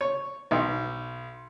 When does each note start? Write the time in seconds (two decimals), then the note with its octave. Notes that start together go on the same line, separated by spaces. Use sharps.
0.01 C#5
0.51 B1